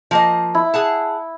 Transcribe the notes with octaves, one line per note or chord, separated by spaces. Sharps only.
F3 A#3 D#5
E4
G#4 F#5 A5